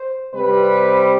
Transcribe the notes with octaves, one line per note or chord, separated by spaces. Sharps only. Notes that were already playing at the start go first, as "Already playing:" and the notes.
Already playing: C5
C3 G3 C4 B4